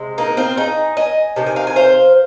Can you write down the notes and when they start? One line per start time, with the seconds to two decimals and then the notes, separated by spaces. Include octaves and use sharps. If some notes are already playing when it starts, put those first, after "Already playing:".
Already playing: C3 G#3
0.18 A#3 D#4
0.37 C4 F4
0.57 D#4 G#4
0.97 D#5 G#5
1.36 C3 D#3
1.46 G#5
1.56 F5
1.67 G#5
1.76 C5 F5